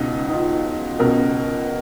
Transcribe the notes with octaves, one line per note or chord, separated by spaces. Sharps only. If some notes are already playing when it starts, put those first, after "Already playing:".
Already playing: C#2 B2 D#4
D#4
F4
C#2 B2 A#4